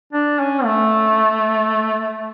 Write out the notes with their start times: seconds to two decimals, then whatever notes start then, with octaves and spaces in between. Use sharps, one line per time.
0.13 D4
0.39 C#4
0.65 A3